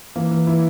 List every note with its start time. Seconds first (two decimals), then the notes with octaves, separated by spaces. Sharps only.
0.16 E3 A#3
0.31 E3
0.47 E3 E4